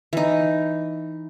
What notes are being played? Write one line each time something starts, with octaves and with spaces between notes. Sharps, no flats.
E3 D#4